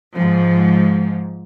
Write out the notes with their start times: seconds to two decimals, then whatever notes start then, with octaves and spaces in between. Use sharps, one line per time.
0.14 G#2 F3